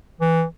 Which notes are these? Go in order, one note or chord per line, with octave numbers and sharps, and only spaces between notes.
E3